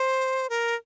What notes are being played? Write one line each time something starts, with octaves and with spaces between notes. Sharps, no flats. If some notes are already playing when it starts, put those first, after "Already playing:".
Already playing: C5
A#4